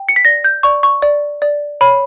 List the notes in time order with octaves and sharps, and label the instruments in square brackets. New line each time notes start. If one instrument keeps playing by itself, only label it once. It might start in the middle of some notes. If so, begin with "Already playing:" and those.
Already playing: [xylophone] G5
C#7
B6
D5 A#6
G6
D5 C#6
C#6
D5
D5
C#5 B5